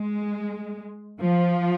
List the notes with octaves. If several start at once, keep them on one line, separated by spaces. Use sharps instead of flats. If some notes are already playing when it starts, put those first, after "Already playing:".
Already playing: G#3
F3